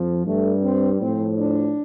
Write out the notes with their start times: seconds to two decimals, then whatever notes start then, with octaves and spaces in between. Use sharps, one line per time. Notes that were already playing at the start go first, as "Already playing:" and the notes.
Already playing: F2 F3
0.25 G2 G3 A3
0.62 C4
1.00 A2 F3 C4
1.38 D4